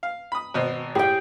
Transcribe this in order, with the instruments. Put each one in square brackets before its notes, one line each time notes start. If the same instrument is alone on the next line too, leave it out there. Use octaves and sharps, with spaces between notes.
[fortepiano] F5
B5 D#6
G#1 B2 C5
[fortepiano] A2 G#4 [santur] G4 G5